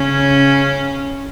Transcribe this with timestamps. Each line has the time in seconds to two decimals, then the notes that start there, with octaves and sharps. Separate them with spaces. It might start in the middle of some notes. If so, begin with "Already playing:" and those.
Already playing: C#3 C#4